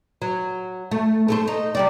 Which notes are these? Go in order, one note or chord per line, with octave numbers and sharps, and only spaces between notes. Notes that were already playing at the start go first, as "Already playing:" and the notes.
F#3
A3
A3 A4 C5
D#4
C3 G3 D5